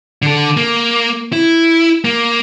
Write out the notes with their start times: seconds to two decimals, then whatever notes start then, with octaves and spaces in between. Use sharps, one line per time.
0.22 D3 A4
0.57 A#3
1.33 E4
2.05 A#3